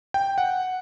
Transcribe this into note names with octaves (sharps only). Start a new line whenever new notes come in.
G5
F#5